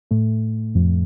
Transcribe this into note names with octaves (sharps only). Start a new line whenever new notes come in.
A2 A3
F2 F3